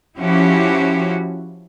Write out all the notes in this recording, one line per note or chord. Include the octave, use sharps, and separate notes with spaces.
F3 C#4 E4 F#4 G4